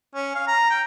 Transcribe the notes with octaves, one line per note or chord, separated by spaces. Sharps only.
C#4
F5
A#5
G5